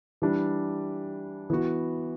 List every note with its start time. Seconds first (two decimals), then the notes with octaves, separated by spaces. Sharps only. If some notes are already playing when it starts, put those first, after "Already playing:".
0.22 E3 G3 D4
1.50 E3 B3 F#4